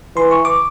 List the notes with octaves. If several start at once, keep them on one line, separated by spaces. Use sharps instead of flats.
E3 C6
C#6
D6